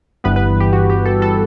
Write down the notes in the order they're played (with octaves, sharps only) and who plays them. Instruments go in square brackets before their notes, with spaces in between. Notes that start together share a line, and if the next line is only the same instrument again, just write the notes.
[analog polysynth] G1 G2 E3 G3 B3 B4
B4
G4
F#4
G4
A4
A4